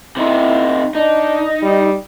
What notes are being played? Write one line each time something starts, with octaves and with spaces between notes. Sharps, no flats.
C3 D#4 E4
D4 D#4
G3